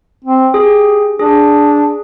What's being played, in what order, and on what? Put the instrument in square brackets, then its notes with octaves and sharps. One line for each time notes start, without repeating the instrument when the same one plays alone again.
[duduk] C4
[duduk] G4 [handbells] G#4
[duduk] D4 [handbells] G#4